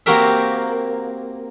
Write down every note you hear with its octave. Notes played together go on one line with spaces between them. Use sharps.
A#3 C4 F#4 G4 A#4 E5